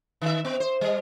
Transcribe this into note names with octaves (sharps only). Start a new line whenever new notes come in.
D#3 E5
B3
C5
G3